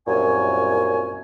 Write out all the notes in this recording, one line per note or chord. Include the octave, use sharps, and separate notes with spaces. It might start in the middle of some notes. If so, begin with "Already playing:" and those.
C2 F#2 A#2 C#5 G#5